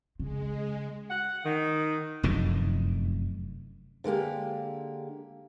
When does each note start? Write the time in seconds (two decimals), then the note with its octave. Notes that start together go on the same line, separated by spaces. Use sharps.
0.19 C#3 G#3
1.10 F#5
1.45 D#3
2.23 F1 F#2 A2 D#3
4.04 D3 G#3 A#3 G4